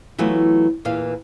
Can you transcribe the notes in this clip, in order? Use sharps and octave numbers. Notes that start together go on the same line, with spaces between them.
E3 F#3 A3 B3 F4
E2 A#2 E3 F5